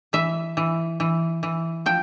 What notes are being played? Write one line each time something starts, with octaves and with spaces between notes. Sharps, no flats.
E3 E5
E3
E3
E3
F3 G5